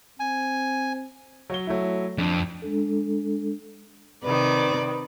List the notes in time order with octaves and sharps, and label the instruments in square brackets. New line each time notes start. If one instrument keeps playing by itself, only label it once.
[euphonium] C4 [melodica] G#5
[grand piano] F#3 C#5 G7
F#3 A3 E4
[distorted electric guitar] F2 [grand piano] D4
[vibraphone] G#3 D4 A4
[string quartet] C3 D5 [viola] D#3 B4